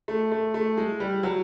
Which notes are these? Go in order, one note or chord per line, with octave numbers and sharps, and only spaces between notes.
A3
A3
A3
G#3
G3
F#3